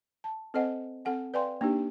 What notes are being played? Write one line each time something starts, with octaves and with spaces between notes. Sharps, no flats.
A5
C4 A4 C5 D#5 F#5 G#5
C4 A4 F#5 G#5
B4 D5 F5 G5 G#5 C6
A#3 D4 D#4 G4